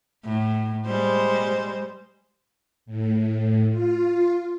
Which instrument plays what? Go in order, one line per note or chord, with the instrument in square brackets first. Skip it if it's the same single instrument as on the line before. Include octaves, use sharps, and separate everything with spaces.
[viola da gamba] A2
G3 G#3 C5
[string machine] A2
F4